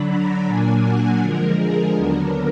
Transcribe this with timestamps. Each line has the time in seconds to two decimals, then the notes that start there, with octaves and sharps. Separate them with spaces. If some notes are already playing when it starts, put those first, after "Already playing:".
Already playing: D3 F#3 D4 B5
0.09 A#5
0.46 A#2 F#3 A#3 D4 G#5
0.83 F#5
1.21 D3 F3 G#3 A#4
1.59 G#4
1.96 D#2 D3 F#3 B3 D4 A#4